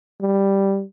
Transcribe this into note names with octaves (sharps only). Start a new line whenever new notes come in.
G3